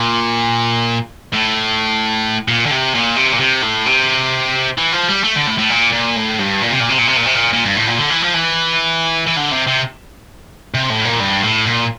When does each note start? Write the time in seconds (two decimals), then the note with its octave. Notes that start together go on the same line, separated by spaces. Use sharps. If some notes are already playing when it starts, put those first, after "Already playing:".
Already playing: A#2
1.34 A2
2.48 A#2
2.66 D3
2.71 C3
2.94 A#2
3.17 C3
3.33 A#2
3.40 C3
3.63 A2
3.86 C3
4.78 E3
4.93 F3
5.09 G3
5.24 A3
5.35 D3
5.47 A2
5.58 A2
5.70 A#2
5.92 A#2
6.16 A2
6.39 G2
6.62 A#2
6.71 C3
6.80 A#2
6.89 C3
6.98 A#2
7.07 C3
7.16 A#2
7.26 C3
7.35 A#2
7.53 A#2
7.64 G2
7.77 A2
7.87 A#2
7.99 D3
8.10 E3
8.22 F3
8.34 E3
9.27 E3
9.37 D3
9.52 C3
9.68 C3
10.74 C3
10.90 A2
11.05 A#2
11.20 G2
11.44 A2
11.67 A#2